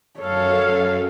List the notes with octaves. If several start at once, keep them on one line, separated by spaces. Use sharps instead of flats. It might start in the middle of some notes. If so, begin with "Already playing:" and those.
F#2 A4 C#5 F5